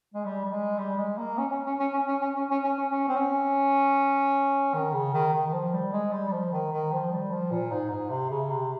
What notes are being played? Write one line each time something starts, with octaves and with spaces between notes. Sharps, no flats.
G#3
G3
G3
G#3
G3
G#3
A#3
C#4
C#4
C#4
C#4
C#4
C#4
C#4
C#4
C#4
C#4
C#4
C#4
C4
C#4
D#3
C#3
D#3
D#3
D#3
F3
G3
G#3
G3
G3
F3
D#3
D#3
F3
G3
F3
A#2
G#2
G#2
C3
C#3
C3